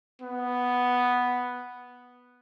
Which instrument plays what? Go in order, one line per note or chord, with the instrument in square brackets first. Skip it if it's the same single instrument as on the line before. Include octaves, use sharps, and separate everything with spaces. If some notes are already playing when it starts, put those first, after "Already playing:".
[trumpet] B3